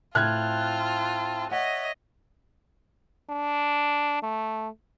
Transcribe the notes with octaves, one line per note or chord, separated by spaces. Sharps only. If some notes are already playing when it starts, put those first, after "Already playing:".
A2 C4 F4 A5 F6 F#6 G#6
C#5 D#5 E5 F#5
D4
A3